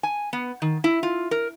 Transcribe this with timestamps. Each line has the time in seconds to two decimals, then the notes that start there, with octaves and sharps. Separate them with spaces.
0.03 G#5
0.33 B3
0.62 D#3
0.84 E4
1.03 F4
1.31 A#4